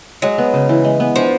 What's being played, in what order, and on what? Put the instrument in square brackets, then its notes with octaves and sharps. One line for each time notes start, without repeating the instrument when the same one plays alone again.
[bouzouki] F#3 [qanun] G#3
[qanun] B3
C#3
E3
G#3
B3
[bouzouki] F3 [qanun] D4